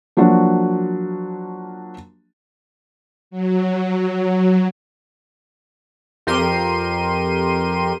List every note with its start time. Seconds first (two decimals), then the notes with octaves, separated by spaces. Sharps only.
0.17 F3 F#3 A#3 D4 F#4
3.31 F#3
6.27 F2 G4 A#4 C6 D#7